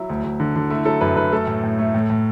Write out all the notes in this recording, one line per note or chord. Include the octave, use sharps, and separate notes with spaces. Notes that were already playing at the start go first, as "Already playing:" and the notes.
Already playing: F#3 E4
D2
D2
D3
D3
A3 E4
F#3 A4
F#2 B4
F#2 B4
A3 A4
A2
A2
A3
A2
A2